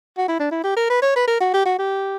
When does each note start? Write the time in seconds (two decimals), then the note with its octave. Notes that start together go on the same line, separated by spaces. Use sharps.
0.18 F#4
0.28 E4
0.39 D4
0.51 E4
0.64 G4
0.77 A#4
0.90 B4
1.02 C#5
1.16 B4
1.27 A#4
1.41 F#4
1.54 G4
1.65 F#4
1.79 G4